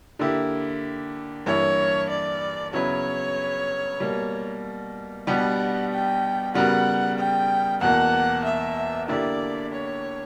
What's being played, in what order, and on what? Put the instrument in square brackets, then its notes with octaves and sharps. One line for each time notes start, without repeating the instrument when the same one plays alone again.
[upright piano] D3 A#3 E4 G4
[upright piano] G2 E3 A#3 E4 [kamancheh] C#5
[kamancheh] D5
[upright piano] C#3 F#3 B3 E4 B4 [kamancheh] C#5
[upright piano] B2 G3 A#3
[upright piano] B2 G3 B3 D4 G4 [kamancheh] F#5
[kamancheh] G5
[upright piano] C#3 G3 B3 F#4 A#4 [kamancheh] F#5
[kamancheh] G5
[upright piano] E2 B2 A#3 [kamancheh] F#5
[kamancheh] E5
[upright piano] D3 A#3 E4 G4 [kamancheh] D5
[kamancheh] C#5